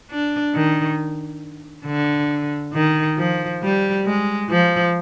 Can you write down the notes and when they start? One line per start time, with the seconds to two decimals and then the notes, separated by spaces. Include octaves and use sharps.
0.11 D4
0.54 D#3
1.85 D3
2.73 D#3
3.18 F3
3.62 G3
4.06 G#3
4.50 F3